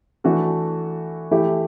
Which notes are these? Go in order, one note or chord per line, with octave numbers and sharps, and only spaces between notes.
E3 A3 D4 F#4 A4
E3 A3 E4 G4